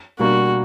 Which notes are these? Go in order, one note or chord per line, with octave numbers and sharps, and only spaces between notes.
B2 G3 A#3 D4 F#4